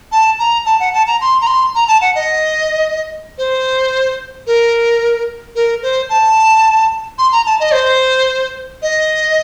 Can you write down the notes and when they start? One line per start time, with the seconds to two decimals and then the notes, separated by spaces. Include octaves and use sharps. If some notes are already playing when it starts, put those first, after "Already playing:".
0.12 A5
0.39 A#5
0.65 A5
0.80 F#5
0.94 A5
1.07 A#5
1.21 C6
1.41 A#5
1.47 C6
1.75 A#5
1.88 A5
2.01 F#5
2.15 D#5
3.38 C5
4.47 A#4
5.56 A#4
5.83 C5
6.10 A5
7.18 C6
7.32 A#5
7.46 A5
7.60 D#5
7.73 C5
8.82 D#5